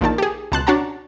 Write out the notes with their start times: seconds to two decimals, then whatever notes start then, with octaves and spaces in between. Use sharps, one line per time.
0.01 A#1 A#2 D#3 A5
0.18 G4 G#4
0.52 C#2 B2 A5 C6 F#6
0.67 C#4 D4 F#4 F#5 A5 A#5